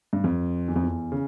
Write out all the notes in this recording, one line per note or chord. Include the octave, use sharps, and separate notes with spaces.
G2
F2
E2
F2
E2
C#3